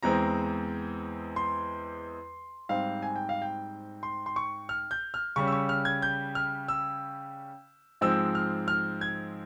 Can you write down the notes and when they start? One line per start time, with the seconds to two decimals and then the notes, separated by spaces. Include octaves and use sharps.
0.03 E2 E3 G#3 C4 A#5
1.36 C6
2.69 G#2 G3 C4 F5
3.02 G#5
3.16 G5
3.29 F5
3.42 G5
4.03 C6
4.26 C6
4.36 C#6
4.69 F6
4.91 G6
5.14 F6
5.36 C#3 G3 C#4 C#6
5.47 E6
5.52 C#6
5.69 F6
5.85 G#6
6.02 G6
6.35 F6
6.68 E6
8.01 G#2 F3 G#3 C4 E6
8.35 F6
8.68 F6
9.01 G#6